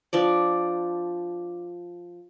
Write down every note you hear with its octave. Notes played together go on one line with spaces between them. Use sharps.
F3 D4 D5